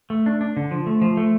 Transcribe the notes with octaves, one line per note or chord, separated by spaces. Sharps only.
A3
D4
D4
D3
F3
A3
F3
A3